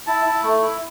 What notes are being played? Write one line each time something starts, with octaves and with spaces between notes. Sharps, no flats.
E4 A5
E4
A3
E4